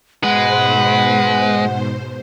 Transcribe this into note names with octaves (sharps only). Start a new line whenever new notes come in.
G#2 B2 G#3 B4 C5 F#5